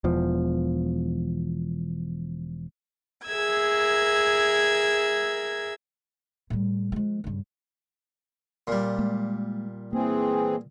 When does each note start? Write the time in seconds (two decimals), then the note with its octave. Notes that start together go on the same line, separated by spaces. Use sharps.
0.04 E1 E2 F3
3.26 G#4 A#4 E5 E6 G#6
6.50 A2 G3
6.92 F3 G#3
7.24 G2 C#3
8.67 A#2 G3
8.99 G#3 A#3
9.93 E3 A#3 C4 G#4